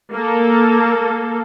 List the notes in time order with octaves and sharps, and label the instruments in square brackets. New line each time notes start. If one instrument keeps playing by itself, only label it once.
[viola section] A#3 A4